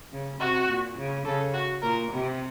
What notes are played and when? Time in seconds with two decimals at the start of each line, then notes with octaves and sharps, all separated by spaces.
0.12 C#3
0.40 C3 F#4
0.69 A#2
0.97 C#3
1.25 C#3 A4
1.54 F#4
1.82 A#2 A#4
2.10 C3